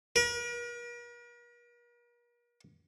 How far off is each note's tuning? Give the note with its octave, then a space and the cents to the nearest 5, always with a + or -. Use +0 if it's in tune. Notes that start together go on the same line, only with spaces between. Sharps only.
A#4 +45